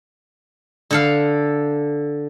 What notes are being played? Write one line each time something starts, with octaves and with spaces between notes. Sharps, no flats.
D3 A4 F5